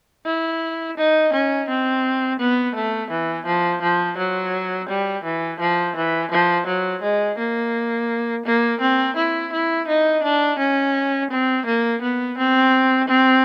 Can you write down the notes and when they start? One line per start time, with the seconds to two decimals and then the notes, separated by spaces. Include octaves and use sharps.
0.26 E4
0.97 D#4
1.33 C#4
1.68 C4
2.39 B3
2.75 A3
3.10 E3
3.46 F3
3.82 F3
4.18 F#3
4.89 G3
5.24 E3
5.60 F3
5.96 E3
6.31 F3
6.67 F#3
7.02 G#3
7.38 A#3
8.45 A#3
8.81 C4
9.17 E4
9.52 E4
9.88 D#4
10.23 D4
10.59 C#4
11.30 C4
11.66 A#3
12.02 B3
12.38 C4
13.08 C4